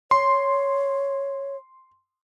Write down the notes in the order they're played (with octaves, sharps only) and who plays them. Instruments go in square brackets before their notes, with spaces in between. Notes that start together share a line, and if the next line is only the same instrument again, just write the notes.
[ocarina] C#5 [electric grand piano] C6